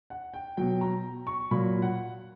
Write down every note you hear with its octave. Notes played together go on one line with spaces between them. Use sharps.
F#5
G5
B2 F#3 G5
A#5
C#6
A#2 F#3 B5
F#5